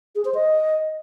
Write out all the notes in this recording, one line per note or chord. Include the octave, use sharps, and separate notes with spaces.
G#4
C5
D#5